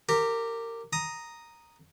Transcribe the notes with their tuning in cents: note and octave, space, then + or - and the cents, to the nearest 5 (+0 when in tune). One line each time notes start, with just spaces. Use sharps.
G4 +0 A#4 -25
A#5 +0 D#6 +0